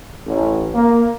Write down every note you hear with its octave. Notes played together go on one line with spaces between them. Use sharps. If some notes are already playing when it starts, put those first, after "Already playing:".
A1
A#3